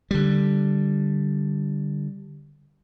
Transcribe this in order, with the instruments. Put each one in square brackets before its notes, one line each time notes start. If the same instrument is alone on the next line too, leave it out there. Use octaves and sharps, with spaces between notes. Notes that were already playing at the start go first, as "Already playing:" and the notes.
[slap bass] D3 G3